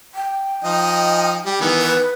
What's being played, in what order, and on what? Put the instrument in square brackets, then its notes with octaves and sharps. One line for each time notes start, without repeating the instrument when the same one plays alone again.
[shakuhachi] G5
[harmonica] F3 D#4 D#5
G3
D#3 E3 B3
[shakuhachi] B4